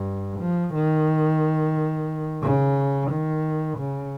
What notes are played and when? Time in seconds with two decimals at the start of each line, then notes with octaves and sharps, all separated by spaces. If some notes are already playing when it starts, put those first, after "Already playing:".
Already playing: G2
0.40 F3
0.74 D#3
2.42 C#3
3.11 D#3
3.78 C#3